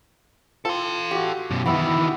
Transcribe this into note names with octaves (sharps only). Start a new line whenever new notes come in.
F4 A4 F5 G5 C6
F#4 G4
F#2 B2
D#3 E3 B3 E4